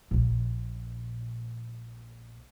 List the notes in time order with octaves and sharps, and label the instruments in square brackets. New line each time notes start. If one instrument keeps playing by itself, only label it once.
[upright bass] A#1 A#2